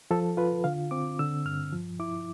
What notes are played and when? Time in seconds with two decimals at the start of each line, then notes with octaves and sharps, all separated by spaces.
0.11 F3 A4
0.37 F4 B4
0.64 D3 F5
0.91 C4 D6
1.19 D3 E6
1.45 G2 F6
1.72 F3
2.00 E4 D6